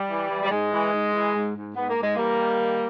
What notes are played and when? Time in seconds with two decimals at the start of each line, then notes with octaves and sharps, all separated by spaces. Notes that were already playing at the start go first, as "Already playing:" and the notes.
Already playing: G3
0.08 E3
0.29 E3
0.43 G3
0.50 G#2 G#3
0.72 E3
0.92 G#2
1.13 E3
1.34 G#2
1.55 G#2
1.76 G#2 B3
1.89 A#3
1.96 G#2
2.03 G#3
2.16 E3 G3 A#3
2.39 D#3
2.59 D#3